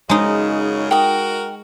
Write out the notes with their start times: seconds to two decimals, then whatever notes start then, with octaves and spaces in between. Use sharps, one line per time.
0.09 F#2 C#3 G#3 D#4
0.91 F#4 A#4 G5 D#6